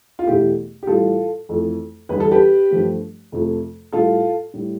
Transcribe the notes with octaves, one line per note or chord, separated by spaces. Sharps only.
F4
E2 B2 A3 E4 G4
G4
A2 E3 G3 F4 A4
F2 E3 A3
E2 D3 G3 B4
A4
G4 B4
G2 F3 A3
F2 C3 F3 A3
A2 G3 F4 A4
A2 G3